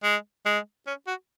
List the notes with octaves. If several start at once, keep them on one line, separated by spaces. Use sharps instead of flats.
G#3
G#3
C#4
F#4